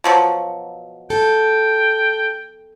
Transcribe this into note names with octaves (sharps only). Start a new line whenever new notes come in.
B2 F3 F#3
A4 G5